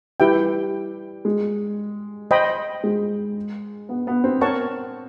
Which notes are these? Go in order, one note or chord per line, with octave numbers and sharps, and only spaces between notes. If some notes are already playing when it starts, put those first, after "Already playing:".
G3 E4 G4 B4 E5 G5
G#3
C5 D#5 G5 B5
G#3
B3
B3
C4
C4 A#4 C#5 F#5 A5 C#6